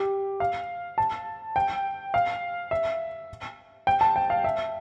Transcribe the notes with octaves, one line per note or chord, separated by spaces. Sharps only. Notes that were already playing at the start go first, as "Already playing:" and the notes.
Already playing: G4
F5
A5
G5
F5
E5
G5
A5
G5
F5
E5